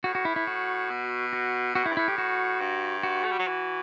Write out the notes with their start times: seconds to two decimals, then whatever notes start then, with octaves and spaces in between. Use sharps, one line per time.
0.04 A2 F#4
0.15 F#4
0.25 E4
0.36 E4
0.47 F#4
0.90 B2
1.33 F#4
1.75 B2 F#4
1.84 A2 E4
1.91 G2
1.97 A2 E4
2.08 G4
2.18 F#4
2.61 G2
3.03 F#4
3.24 A3
3.32 G3
3.39 F#3
3.47 E3